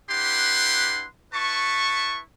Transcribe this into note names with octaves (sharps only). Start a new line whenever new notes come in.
D4 E4 G4 B4 F#5 C6
E4 B4 A5 C#6